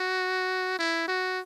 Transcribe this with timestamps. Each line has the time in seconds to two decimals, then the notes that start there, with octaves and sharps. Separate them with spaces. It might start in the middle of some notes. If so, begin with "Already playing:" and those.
Already playing: F#4
0.79 E4
1.08 F#4